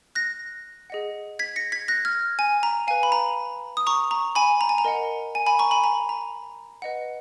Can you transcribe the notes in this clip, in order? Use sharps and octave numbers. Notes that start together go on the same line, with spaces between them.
F#6 A#6
G#4 D#5 F#5
G#6 B6
A#6 C#7
G#6 B6
F#6 A#6
F6 G#6
G#5
A#5
B4 F5 G#5
B5
A#5
D#6
A#5 C#6
A#5 C#6
G#5 B5
A#5
G#5
A#5
A#4 D#5 F#5
G#5
G#5 B5
A#5 C#6
G#5 B5
A#5
A#5
B4 D#5 F#5